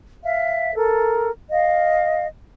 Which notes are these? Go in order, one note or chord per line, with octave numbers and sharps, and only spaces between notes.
E5 F5
A4 A#4
D#5 F5